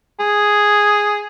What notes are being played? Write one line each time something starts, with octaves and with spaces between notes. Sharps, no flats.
G#4